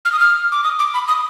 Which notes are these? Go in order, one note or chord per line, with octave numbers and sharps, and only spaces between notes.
F6
D#6
F6
D6
D#6
D6
B5
D#6